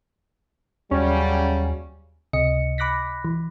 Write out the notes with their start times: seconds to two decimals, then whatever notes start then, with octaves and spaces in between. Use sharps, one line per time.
0.91 D#2 C#3 F#3 G3 C#4
2.33 C#2 C3 D#5 C#7
2.78 B5 D6 F#6 A#6 B6
3.25 E3